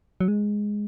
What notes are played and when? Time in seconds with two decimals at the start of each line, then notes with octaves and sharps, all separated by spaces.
0.21 F#3
0.28 G#3